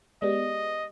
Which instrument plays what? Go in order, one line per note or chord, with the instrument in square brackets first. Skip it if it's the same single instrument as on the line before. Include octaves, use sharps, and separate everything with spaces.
[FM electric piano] G#3 B3 [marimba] G4 D5 [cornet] D#5